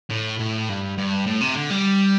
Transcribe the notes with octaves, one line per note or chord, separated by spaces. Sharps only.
A2
A2
G2
G2
A2
C3
D3
G3